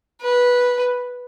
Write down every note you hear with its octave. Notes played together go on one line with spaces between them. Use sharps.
B4